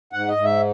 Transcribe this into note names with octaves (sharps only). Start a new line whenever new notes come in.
G#2 F#5
D#5
G#2
E5